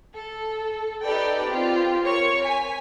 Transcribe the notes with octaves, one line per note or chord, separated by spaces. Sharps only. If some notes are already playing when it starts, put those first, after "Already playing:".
A4
D#4 G4 A4 B4 D5 G5
C4 F4 G4
A#4 C#5 C#6
G#5 B6